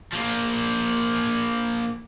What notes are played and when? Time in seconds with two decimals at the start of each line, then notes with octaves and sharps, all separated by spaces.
0.13 F3 A#3